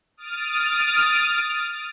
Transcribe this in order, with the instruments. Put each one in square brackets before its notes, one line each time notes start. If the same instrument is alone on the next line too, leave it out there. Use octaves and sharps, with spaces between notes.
[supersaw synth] D#6 F6 A6 D7 D#7